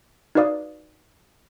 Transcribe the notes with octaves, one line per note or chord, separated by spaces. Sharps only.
D#4 F#4 B4 D5 F5 D#6